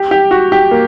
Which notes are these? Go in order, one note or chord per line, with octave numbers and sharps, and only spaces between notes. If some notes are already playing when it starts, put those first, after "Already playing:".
Already playing: G4
G4
F#4
G4
A#3